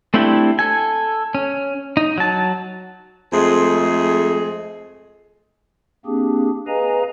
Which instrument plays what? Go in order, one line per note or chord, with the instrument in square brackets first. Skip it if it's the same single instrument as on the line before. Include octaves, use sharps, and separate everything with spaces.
[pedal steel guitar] A3 C4 D4 E4 G4
A4 G#5
C#4
D#4
F#3 A5
[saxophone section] F2 G#3 A3 G#4
[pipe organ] A#3 C4 D4 G4 G#4
G#4 B4 D#5 F5 G#5 A#5